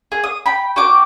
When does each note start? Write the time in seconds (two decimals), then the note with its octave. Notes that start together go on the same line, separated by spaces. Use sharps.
0.12 G#4
0.24 D#6
0.46 G5 B5
0.76 F#4 G5 D6